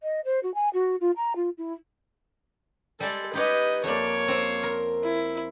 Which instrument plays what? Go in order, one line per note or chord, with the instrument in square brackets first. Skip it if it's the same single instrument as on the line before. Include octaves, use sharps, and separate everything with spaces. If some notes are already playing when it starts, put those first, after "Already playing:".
[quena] D#5
C5
F#4
G#5
F#4
F4
A#5
F4
E4
[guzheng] G3 G#3 [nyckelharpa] A4
[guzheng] D#4 G4 C#5 [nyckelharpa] B4 D#5
[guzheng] F2 D5 [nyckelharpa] A#3 C#5
[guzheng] C4
A#4
[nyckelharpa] E4